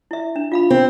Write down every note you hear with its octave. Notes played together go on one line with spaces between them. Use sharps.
E4 E5
D4
F4 F5 B5
C4